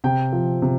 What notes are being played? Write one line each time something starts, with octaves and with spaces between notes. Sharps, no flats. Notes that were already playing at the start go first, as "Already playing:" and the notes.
C3 G5
F3
C3